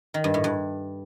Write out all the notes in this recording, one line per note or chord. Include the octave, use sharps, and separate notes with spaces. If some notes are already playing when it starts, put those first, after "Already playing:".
D#3
G2
A2
G2